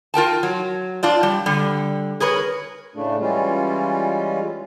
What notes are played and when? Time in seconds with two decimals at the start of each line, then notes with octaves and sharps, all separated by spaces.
0.14 F4 A#4 G5 A5
0.43 F#3
1.03 D4 F4 D5
1.23 G3
1.46 D3 G3
2.20 G#4 A#4 B4 C#5
2.95 A2 C#3 A3 D4
3.21 E3 G3 G#3 C#4 F4